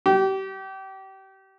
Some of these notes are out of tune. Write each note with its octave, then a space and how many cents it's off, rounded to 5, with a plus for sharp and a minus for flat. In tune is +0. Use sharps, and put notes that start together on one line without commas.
G4 -30